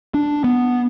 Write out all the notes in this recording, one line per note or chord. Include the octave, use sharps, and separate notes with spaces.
D4
B3